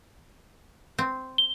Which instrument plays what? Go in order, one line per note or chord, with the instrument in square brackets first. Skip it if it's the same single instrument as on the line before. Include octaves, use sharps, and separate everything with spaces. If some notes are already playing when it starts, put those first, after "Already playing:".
[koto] C4
[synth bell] G7